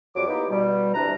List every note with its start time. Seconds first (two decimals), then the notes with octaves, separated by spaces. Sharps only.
0.16 F2 F#3 G3 D6
0.27 A#3 B3 D#4 E4 G4
0.49 B2 G3
0.94 D2 C3 E3 D4 B4 A#5